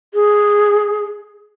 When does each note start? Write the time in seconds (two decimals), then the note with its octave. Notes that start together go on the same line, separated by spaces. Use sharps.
0.14 G#4